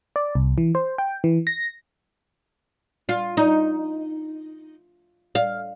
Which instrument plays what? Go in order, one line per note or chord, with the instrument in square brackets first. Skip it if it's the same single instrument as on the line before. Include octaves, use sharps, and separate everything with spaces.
[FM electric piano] D5
C2
E3
C5
G5
E3
A#6
[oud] F4
D#4
F5